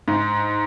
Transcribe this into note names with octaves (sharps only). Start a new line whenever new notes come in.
G#2